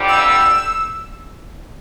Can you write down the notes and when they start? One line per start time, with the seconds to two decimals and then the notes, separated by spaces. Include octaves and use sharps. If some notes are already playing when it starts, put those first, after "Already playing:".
Already playing: F2 D3 G3
0.09 E6